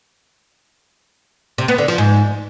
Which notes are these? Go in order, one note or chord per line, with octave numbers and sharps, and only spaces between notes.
C3
B3
D3
F3
G#2